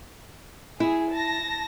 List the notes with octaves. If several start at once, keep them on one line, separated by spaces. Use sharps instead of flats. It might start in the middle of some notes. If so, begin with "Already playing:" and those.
E4 G#4
A5 A#6